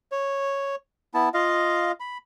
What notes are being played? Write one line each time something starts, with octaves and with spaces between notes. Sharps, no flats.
C#5
B3 E4 A5
F4 D#5 F5
B5